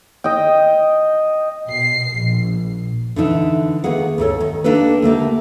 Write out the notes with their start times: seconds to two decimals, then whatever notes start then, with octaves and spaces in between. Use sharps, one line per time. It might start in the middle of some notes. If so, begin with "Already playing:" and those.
0.24 D#5 G5
1.68 B2 C7
2.16 A#1
3.16 D3 E3 D#4 E5
3.84 D#3 A#3 B3 G#4 F#5
4.18 D2 G2 A4 C#5
4.40 D#3
4.64 A#3 D4 D#4 G4 A4 B4
5.02 D3 A3 A#3 G4